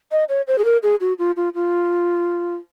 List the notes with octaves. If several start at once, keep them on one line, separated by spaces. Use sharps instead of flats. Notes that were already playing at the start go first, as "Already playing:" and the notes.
D#5
C#5
C5
G#4
A#4
G#4
F#4
F4
F4
F4